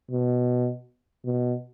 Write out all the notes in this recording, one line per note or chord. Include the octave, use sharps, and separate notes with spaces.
B2
B2